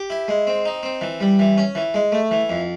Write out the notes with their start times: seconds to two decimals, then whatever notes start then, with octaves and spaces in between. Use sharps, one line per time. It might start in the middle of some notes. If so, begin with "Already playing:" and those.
Already playing: G4
0.10 E4
0.28 G#3
0.47 C4
0.65 D#4
0.83 C4
1.01 E3
1.20 G3
1.39 E3
1.58 C#4
1.75 E3
1.94 G#3
2.12 A3
2.31 E3
2.49 F2